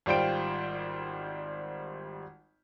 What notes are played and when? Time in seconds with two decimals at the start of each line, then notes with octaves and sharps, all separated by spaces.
0.06 G#1 G3 F4 C5 G5 D7